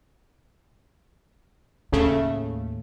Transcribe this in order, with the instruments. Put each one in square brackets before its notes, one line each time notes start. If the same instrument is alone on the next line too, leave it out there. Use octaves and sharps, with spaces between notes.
[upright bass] D#2 A2 [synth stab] C#3 A3